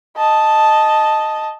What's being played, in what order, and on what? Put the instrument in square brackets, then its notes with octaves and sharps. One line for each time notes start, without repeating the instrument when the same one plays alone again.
[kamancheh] D#5 A5